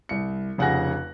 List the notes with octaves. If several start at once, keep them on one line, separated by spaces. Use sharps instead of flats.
C2 C#7
F1 C#3 F#5 G#5 F#6 A#6